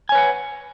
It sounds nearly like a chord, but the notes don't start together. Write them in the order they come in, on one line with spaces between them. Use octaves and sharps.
G#5 C#5 B4 F#5